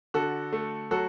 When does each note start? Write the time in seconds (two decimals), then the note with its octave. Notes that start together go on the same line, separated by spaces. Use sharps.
0.14 D3 F#4 A4
0.53 A3
0.91 F#3 F#4 A4